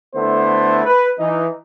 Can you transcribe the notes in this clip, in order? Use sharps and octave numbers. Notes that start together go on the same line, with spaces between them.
D3 A3 B3 E4 C5
B4
E3 D#4